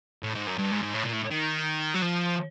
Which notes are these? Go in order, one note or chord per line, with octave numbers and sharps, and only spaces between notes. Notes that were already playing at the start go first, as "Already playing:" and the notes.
A2
G#2
F#2
G2
G#2
G#2
A2
A#2
A2
D#3
F#3
F3